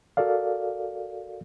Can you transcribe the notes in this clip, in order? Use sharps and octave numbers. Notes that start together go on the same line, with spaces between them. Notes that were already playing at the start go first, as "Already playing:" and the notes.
F#4 A4 A#4 D5 F5